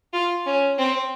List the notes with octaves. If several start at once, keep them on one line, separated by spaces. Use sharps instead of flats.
F4
C#4
C4